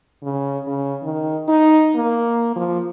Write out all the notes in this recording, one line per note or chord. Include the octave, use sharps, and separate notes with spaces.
C#3
C#3
D#3
D#4
A#3
F3